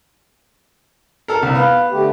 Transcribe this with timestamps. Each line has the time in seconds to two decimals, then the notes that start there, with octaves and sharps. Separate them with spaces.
1.28 A4 A#4
1.43 C2
1.55 B3 F5
1.92 D3 A3 G4